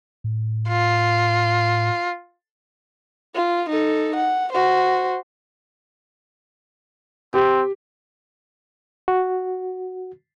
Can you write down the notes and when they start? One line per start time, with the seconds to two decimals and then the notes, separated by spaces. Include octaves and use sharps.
0.24 A2
0.69 F4
3.35 F4
3.69 D#4 A4
4.16 F#5
4.53 F#4 C5
7.34 C4 G4
9.08 F#4